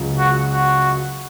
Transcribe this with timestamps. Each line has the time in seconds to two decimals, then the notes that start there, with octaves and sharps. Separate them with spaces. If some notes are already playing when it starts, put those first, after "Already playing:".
Already playing: C#2 C#3 F#3
0.18 F#4
0.52 F#4